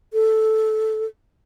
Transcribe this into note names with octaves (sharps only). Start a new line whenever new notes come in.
A4